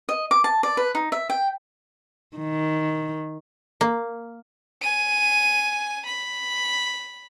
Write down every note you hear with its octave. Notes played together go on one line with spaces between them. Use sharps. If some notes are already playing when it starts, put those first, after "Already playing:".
D#5
D6
A5
D5
B4
D#4
E5
G5
D#3
A#3
G#5 D#7
B5